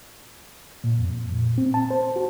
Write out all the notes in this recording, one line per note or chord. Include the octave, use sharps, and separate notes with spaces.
A#2
F2
A#2
C4
A5
C5
F#4